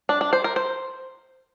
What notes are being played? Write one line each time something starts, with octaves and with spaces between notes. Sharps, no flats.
D4
D4
C5
A#4
C5